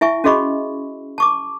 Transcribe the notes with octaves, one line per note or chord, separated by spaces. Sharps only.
E4 E5 G#5 C#6
C#4 F#4 G#4 D#5 B5 C#6
A5 C#6 D6